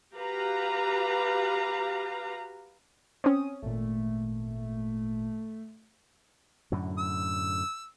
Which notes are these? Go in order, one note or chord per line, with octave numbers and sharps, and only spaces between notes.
F#4 G4 B4 F5 A#5
C4 C#4 D#6
G#1 A#2 A3
F#2 A2 D3
E6